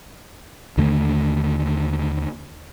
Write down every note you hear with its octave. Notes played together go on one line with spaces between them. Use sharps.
D#2 D3 A3